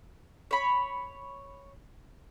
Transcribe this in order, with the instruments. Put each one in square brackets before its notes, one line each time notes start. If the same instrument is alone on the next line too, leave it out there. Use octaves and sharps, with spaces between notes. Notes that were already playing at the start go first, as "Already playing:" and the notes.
[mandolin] C#5 B5